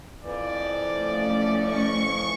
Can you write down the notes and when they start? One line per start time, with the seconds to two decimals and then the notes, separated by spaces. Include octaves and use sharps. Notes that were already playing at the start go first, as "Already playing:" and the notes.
0.23 F2 E3 F3 D5
0.94 A3 C#4
1.63 C#6